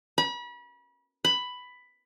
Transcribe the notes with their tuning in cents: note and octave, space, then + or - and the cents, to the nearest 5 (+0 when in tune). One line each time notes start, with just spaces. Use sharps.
B5 -35
B5 +10